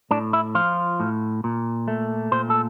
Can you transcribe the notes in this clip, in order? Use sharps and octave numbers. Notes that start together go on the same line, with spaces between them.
A2 D4
E4
F3 F4
A2
A#2
A3
A#2 C5
A4